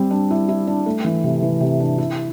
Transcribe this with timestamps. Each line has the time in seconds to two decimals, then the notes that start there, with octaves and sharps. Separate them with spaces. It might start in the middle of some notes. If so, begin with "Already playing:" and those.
Already playing: G3 C4
0.11 D4
0.31 E4
0.49 E4
0.67 D4
0.86 A3
1.05 E3
1.24 C3
1.42 E3
1.60 C3
1.80 D4
1.98 E4